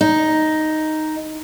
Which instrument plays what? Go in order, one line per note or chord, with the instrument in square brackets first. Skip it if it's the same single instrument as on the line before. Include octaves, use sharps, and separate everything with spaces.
[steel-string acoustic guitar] D#4